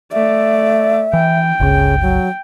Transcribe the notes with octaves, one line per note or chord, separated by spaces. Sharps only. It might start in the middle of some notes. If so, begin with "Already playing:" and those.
A3 D5 E5
E3 G5
G1 C#2 C#3
F#3